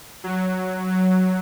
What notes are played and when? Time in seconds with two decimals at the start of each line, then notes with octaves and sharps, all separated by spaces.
0.24 F#3
0.89 F#3